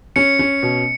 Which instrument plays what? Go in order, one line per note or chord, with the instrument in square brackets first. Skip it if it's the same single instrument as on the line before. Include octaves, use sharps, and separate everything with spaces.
[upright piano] C#4 [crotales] C#7
[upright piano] C#4
B2